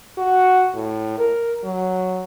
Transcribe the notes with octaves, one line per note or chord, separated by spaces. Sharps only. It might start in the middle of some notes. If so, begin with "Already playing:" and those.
F#4
A2
A#4
F#3